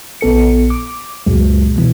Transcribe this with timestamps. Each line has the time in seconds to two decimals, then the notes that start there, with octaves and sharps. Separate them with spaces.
0.21 A#1 B3 A4 C#7
0.70 D6
1.26 C#2 F#2 A#2 F#3 G#3
1.76 B2 E3